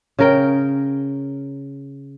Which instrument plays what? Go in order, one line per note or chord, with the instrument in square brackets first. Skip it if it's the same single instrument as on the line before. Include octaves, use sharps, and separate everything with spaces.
[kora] C#3 A#4 G5